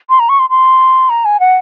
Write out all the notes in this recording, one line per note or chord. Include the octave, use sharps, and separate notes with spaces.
C6
A#5
C#6
C6
C6
A#5
G#5
F#5